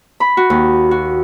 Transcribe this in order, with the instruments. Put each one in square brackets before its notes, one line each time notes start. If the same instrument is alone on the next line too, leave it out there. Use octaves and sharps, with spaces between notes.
[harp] B5
F#4
D#2
F#4